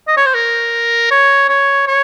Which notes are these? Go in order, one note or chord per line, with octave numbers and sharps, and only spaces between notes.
D#5
C#5
C5
A#4
C#5
C#5
C#5